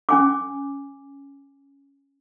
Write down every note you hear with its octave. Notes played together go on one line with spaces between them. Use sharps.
C#4 G#5 D6